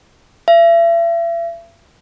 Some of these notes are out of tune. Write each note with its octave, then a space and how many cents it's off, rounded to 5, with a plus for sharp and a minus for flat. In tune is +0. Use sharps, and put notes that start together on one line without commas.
E5 +40